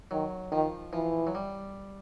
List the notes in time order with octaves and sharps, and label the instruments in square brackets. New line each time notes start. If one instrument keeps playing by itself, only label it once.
[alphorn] D#3 [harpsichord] F#3
[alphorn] D#3 [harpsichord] F3
[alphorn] E3 [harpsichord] F3
[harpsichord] F#3
G3